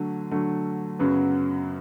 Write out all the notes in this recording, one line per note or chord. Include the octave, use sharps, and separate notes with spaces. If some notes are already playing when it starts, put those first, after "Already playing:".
Already playing: D3 F#3 A3
D3 F#3 A3
F#2 C#3 F#3 B3